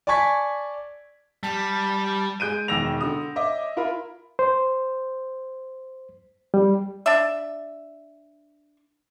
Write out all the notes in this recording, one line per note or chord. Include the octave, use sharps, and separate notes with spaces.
D5 G#5 A5 C#6 G#6 B6
G3 A5
G#3 G#4 G6 D7 D#7
E1 D#3 E6 A#6 F7
D3 D#6
C#5 D#5 E5 D6
E4 F4 A#4 E5 B5
C5
G3
D4 E5